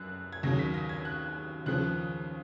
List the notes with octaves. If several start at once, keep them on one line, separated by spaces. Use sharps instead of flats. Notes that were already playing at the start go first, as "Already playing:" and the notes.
Already playing: F#2 F#6
G#6
D#2 C#3 F#3 A#6
B6
A#6
G#6
F#6
D#2 C#3 F3 F#6